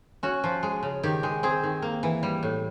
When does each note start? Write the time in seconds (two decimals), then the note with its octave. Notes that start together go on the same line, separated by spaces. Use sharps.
0.23 C#4 F#4
0.44 F3
0.63 G#3
0.83 C#3
1.03 D#3 G4
1.23 G#3
1.43 C4 G#4
1.63 D#3
1.82 A#3
2.03 E3
2.23 G3
2.43 A2